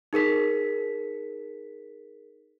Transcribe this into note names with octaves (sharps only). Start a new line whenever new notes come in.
D#4 G#4 A#4 B6